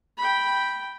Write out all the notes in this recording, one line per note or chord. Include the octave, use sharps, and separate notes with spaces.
G5 B5